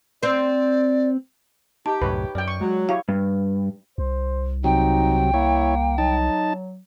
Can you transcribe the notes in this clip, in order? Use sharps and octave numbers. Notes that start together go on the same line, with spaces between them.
C4 C5 D5
D#4 G4 A5
C2 F#2 A2 B4 C#5
F#2 D5 G5
C#6
F#3 G#3
E4 G4 C#5 F5
G2
C2 C5
C3 F#3 D#4 G5
A#3 E4 C#5
F#3 D#4 A5